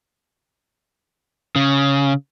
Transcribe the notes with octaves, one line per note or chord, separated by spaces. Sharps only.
C#3